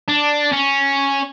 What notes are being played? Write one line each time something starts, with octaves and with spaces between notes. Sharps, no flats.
D4
C#4